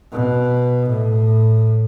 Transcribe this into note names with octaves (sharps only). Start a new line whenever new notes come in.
B2
A2